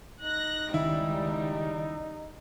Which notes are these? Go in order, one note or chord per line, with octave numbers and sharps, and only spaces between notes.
D#4 F#6 A#6
C#2 D#3 G3 E4